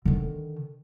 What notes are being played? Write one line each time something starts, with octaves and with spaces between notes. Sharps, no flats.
D3 D#3